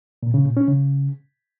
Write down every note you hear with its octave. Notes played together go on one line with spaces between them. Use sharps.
A#2
C#3
A#2
C#4
C#3